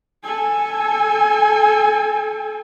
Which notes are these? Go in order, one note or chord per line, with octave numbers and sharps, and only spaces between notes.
A4 G#5